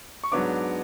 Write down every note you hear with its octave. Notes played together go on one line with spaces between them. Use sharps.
C#6
G#2 F#3 B3 D4 D6